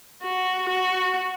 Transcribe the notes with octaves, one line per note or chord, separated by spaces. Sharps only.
F#4
F#4